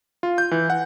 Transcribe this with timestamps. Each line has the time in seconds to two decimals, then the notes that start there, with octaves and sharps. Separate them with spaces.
0.23 F4
0.38 G6
0.51 E3
0.70 F#5